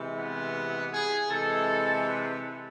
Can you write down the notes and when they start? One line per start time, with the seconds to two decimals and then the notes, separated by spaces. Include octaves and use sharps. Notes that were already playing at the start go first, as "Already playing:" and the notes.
Already playing: C3 E3 G#3
0.16 B3
0.92 G#4
1.29 C3 E3 G#3 A4
2.05 B4